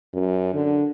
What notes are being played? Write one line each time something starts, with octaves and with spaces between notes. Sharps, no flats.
F#2
D3